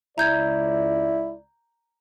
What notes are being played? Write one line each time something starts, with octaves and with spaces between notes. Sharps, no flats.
C#2 E4 D5 A#5 G6 G#6